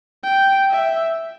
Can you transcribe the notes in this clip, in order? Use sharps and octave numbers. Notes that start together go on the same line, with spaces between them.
G5
E5